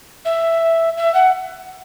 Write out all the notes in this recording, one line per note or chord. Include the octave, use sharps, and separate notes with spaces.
E5
E5
F#5